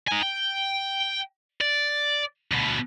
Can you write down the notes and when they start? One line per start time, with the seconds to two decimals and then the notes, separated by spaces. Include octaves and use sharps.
0.08 D#4 G#5
0.23 G5
1.61 D5
2.51 D2 B2